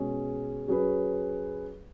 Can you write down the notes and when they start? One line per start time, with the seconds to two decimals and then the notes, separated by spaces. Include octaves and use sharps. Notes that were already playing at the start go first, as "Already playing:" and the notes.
Already playing: B2 G#3 C#4 G#4
0.68 F#3 C#4 G#4 B4